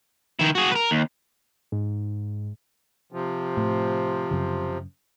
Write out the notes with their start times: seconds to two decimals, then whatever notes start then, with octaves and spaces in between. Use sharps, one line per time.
0.39 D#3 E4
0.55 F#4 G#4
0.72 A#4 B4
0.91 D#2
1.72 G#2
3.12 C3 F3
3.57 A2
4.31 F#2 C#3